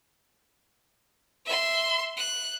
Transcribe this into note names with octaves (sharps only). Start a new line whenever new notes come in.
E5 C6
F#6